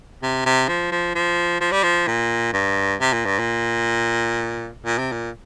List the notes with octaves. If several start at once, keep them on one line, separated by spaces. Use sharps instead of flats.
C3
C3
F3
F3
F3
F3
G3
F3
A#2
G2
C3
A#2
G2
A#2
A#2
C3
A#2